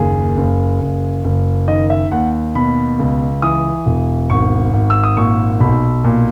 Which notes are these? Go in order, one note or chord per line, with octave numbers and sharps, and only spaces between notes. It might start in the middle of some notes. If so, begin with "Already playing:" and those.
Already playing: F#1 D#2 G#4
F#1
F#1
F#1
D#3 D#5
E5
D#2 F#5
B2 B5
C#2
E3 D#6
E1
G#1 C#6
G#1
E6
D#6
A#2 C#6
B1 B5
A#2